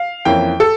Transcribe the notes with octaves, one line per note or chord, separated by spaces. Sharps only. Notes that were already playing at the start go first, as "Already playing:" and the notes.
Already playing: F5
F2 E3 A#3 C#4 G5
A4